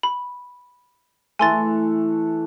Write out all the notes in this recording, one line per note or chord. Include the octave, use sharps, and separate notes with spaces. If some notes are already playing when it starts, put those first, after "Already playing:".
B5
E3 A3 G#5 C6 A6